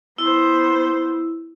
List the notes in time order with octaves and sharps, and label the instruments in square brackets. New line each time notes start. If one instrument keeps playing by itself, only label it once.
[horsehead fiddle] B3 C5 [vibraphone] E4